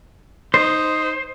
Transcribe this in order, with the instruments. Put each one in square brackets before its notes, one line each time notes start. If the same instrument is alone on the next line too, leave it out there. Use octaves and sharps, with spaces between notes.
[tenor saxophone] D#4 [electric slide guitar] C5